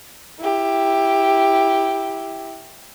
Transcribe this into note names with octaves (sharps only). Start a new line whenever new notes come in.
E4 G4